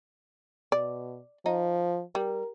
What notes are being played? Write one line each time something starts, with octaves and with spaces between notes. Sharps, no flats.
B2 D5
F3 D#4
G3 A#4